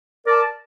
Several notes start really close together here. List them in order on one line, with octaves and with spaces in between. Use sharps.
A#4 D5 A5